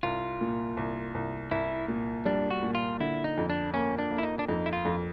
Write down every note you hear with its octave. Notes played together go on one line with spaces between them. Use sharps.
C2 F4
A#2
C2
C2
C2 E4
A#2
G3 D4
F#4
A#2
F4
D3 E4
D#4
F2
D4
A#3 C#4
D4
A#3
E4
D#4
D4
F2 D#4
E4
F4
F2